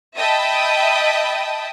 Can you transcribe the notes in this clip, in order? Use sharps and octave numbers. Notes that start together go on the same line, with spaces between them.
D#5 E5 G5 A5 B5 D#6